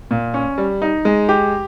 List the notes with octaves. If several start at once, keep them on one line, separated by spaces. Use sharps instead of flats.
A#2
C#4
G3
D#4
G#3
G4